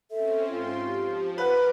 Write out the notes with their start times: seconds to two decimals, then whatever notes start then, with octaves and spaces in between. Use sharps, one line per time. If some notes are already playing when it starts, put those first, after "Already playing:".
0.11 C4 C#4 A4 E5
0.48 G#2 F4 G5 C6
0.86 F3 G4
1.38 A#4 B4 F#5 D6